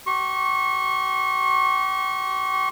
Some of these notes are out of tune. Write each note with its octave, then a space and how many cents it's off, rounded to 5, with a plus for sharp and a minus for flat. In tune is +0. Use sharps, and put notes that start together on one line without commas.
G4 -45 C#6 -30